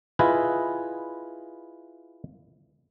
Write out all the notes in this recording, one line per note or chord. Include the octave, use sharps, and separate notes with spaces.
E4 F4 G#4 B4 D#5